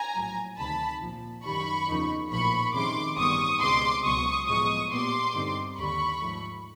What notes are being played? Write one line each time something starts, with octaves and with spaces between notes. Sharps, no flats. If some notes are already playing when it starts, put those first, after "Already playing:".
Already playing: G#5 A#5
A#1 A2 F#3
D2 C3 D#3 A5 B5
A#1 A#2 F3
F#2 D#3 G3 B5 C#6
E2 C#3 F3 A#3 D#4
A#1 A2 F3 A#3 B5 C#6
F2 C3 D#3 G#3 C#4 C6 D6
A1 G2 D#3 G3 B3 C#6 D#6
C#2 B2 G#3 C4 C6 D6
C#2 B2 F#3 C#6 D#6
A2 F3 G#3 B3 C#6 D#6
A#2 G3 B3 C6 D6
G2 D3 G3 C4 D#4
D#2 D3 G3 B5 C#6
G#2 F3 A3